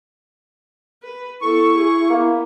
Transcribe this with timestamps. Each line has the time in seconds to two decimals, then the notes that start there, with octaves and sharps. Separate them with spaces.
1.03 B4
1.41 B3 E4 A4 C#6
1.75 G#4
2.10 A#3 B3